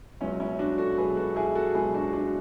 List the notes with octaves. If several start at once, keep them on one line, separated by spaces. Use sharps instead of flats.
C#2 B2 F#3 C#4 E4
C#4 E4
D4 F#4
F#4 A4
C#2 B2 F#3 G#4 B4
F#4 A4
E4 G#4
F#4 A4
C#2 B2 F#3 E4 G#4
D4 F#4
D4 F#4